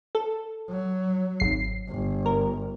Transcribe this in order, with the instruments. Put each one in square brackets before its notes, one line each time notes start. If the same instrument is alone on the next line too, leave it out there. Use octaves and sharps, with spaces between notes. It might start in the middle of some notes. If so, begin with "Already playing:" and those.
[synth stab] A4
[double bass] F#3
[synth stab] G#1 C7
[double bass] G1
[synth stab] A#4